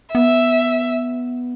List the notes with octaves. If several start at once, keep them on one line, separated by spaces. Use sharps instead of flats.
B3 E5